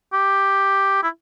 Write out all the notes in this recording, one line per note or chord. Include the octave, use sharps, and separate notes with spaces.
G4
E4